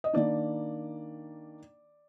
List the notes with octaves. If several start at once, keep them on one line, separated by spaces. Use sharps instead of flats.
D#5
D#3 A#3 D4 D5